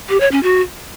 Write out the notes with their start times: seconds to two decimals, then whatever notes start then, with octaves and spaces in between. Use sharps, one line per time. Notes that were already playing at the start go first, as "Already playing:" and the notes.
0.09 G4
0.20 C#5
0.32 C#4
0.43 F#4